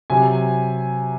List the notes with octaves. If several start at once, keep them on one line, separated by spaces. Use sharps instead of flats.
C3 F#3 G#5